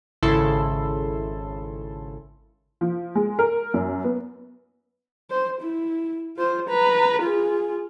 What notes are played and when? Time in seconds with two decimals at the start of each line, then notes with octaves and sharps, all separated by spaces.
0.22 G#1 C#3 E4 A4 C6
2.81 F3
3.15 G#3
3.39 A#4
3.74 F#2
4.04 B3
5.30 C5
5.61 E4
6.37 F4 C5
6.68 B4 A#5
7.22 F4 G#4